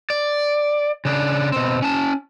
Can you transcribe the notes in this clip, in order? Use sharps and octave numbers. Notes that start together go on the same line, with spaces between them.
D5
C#3 D4
B2 C4
C#4 A5